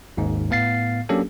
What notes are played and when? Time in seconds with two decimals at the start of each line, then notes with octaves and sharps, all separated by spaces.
0.17 G#1 D#2 G#2
0.50 A2 B3 F5 A6 C7
1.09 F#3 A#3 C#4 D4 G4 A4